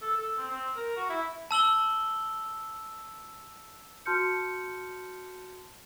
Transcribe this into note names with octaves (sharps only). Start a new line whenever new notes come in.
A4
A4
C4
C4
A#4
F#4
E4
A5 E6 F#7 G7
F#4 A5 C6 F6 G6 C#7